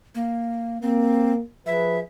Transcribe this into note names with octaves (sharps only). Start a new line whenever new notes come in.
A#3
A#3 C4
F3 G#4 B4 E5